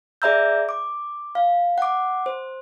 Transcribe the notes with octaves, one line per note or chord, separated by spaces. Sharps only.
G#4 D5 E5 A#5 E6 G6
D6
F5
F#5 D6
C5